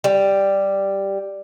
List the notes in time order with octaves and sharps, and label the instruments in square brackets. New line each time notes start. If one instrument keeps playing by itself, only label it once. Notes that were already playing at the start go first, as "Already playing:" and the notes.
[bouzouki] G3